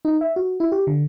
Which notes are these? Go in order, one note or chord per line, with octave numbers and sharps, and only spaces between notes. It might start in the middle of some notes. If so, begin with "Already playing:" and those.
D#4
E5
F#4
E4
G4
D3